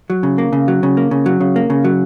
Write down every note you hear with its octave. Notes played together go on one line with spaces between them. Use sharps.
F#3
C#3
A#3
C#3
F#3
C#3
A#3
C#3
F#3
C#3
A#3
C#3
F#3